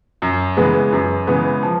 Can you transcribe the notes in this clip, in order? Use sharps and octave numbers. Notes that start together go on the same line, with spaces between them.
F#2
C#3 E3 G#3 B3
F#2
C#3 E3 G#3 B3
F3